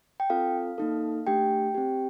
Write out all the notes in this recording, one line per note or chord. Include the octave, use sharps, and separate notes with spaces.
G5
C4 F4 A4 F5
A#3 D#4 A4
A3 D4 G4 G5
C4 G4